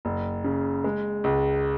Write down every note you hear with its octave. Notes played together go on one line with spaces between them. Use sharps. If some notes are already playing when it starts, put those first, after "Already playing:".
F#1
C#3
G#3
C#2